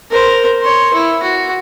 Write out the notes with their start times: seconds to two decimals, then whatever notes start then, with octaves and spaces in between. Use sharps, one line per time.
0.10 A#4 C5
0.61 C#5 C6
0.94 E4
1.22 F#4